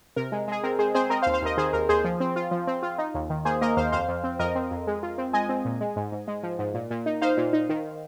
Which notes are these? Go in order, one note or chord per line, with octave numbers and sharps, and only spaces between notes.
C3 A#4
G#3
G#3 G#4
C4 A#4
G#3 G#4 C5
C4 G#4 C5
C4 A#4 D#5
C5 F5
D#2
C5 F5
D#2 A#4 D#5
D#3 G#4 C5
D#2 A#4
D#2 G#4 C5
F3
C4
F4
F3
C4
F4
D#4
D#2
D#3
A#3 G#4 C5
A#3 A#4 D#5
D#2 C5 F5
F2 C5 F5
F2
C4
F2 A#4 D#5
C4
F2
G#3
F4
C4
G#3 D#5 G#5
C4
A#2
G#3
G#2
G#2
G#3
F3
G#2
A#2
A#2
D#4
D#4 C5 F5
A#2
D#4
D#3